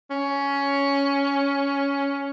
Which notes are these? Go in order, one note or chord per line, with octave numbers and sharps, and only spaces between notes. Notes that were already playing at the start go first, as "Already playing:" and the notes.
C#4